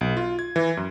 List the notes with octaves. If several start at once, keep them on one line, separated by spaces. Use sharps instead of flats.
B1
F4
G#6
E3
F#2